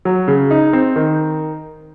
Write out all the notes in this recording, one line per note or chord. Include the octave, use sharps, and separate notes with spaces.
F#3
C#3
D#4
C4
D#3